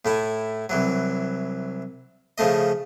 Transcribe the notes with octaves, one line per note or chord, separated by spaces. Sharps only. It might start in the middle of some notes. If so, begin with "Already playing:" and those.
A2 A3 E4
C2 E3 F#3
C#3 F3 A3 D#5